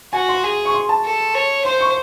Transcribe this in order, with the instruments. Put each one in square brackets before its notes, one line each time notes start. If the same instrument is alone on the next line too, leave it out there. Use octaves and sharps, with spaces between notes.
[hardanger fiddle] F#4 [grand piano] G#5
[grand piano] C6
[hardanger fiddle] G#4
[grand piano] C#6
C6
A5
[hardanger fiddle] A4
C#5
[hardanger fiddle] C5 [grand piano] C6
[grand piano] C#6